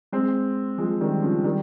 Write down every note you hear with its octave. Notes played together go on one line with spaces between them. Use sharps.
G#3 C4
F3 G#3
D#3 G3
C#3 F3
D#3 G3